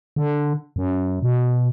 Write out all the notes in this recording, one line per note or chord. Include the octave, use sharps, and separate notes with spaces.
D3
F#2
B2